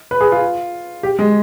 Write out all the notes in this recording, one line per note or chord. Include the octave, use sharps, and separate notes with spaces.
B4
G#4
F4
G4
G#3